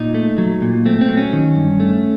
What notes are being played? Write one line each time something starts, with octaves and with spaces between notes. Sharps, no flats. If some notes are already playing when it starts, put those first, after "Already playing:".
Already playing: A#2 D#4
A3
F#3
A#2
A3 C4
C4
F#3
C#4
D#3
G2
A3